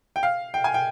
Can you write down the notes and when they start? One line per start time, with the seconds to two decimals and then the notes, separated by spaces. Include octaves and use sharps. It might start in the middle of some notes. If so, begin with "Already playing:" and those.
0.16 G5
0.23 F5
0.54 G5
0.64 G#5
0.74 G5